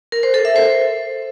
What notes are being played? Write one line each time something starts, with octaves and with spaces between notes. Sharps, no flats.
A#4
C5
A4
E5
C5